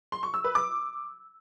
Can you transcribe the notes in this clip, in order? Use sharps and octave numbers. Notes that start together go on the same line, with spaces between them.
C6
C#6
E6
B4
D6